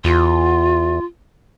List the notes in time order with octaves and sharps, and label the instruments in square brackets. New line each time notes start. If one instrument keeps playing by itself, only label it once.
[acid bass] E2 [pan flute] F4